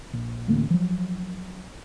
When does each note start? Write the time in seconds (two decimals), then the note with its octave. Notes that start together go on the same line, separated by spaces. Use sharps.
0.13 A#1
0.48 A1 D2 A3 A#3
0.70 F3 F#3